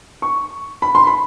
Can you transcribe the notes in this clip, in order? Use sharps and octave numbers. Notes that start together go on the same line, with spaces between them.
C#6
B5
C6
B5